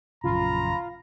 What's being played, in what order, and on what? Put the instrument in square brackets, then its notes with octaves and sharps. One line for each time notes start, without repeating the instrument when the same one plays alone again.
[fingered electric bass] A#1 F#2 C#3 [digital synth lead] F4 [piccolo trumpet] A#5 [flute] B5